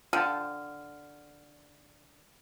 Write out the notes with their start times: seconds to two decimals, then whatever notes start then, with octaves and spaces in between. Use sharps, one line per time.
0.13 D3 F4 G5 A5 F6